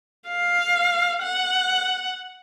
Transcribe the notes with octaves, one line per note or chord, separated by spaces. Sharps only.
F5
F#5